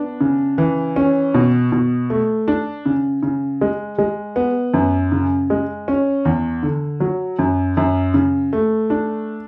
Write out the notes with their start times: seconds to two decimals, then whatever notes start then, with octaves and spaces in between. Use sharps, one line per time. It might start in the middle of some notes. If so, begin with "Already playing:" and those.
Already playing: B3 D4
0.21 C#3
0.58 E3
0.96 C#4
1.34 B2
1.72 B2
2.10 A3
2.48 D4
2.86 C#3
3.23 C#3
3.61 G#3
3.98 G#3
4.36 B3
4.74 F#2
5.12 C#3
5.50 G#3
5.88 C#4
6.25 E2
6.63 D3
7.00 F#3
7.39 F#2
7.77 F#2
8.14 C#3
8.53 A3
8.90 D4